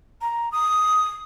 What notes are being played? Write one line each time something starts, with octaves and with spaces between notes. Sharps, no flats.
A#5
D#6